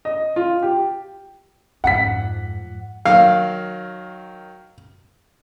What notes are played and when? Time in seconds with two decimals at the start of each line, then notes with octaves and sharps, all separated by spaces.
0.05 D#5
0.36 F4
0.62 G4
1.84 F2 G#2 F#5 B6
3.05 D#3 F#3 F5